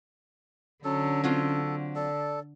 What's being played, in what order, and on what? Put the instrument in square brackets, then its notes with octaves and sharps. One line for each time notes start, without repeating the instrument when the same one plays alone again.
[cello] D3 [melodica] F#3 A4 [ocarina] C#4
[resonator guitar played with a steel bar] F#3 C4 F4 [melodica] A4
[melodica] A4 [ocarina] D5